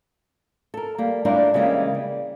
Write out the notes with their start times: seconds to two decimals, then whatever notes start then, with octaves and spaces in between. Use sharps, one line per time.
0.74 A4 A#4
0.98 G3 A#3
1.25 G3 A3 D4 E4 F4 A#4
1.54 C#3 E3 G3 G#3 A#3
1.95 G3